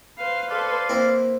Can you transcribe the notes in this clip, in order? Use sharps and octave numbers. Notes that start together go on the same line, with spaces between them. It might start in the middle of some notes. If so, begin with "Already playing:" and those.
B4 C5 F5
A4 C5 D5 F5 C6
A#3 C4 E4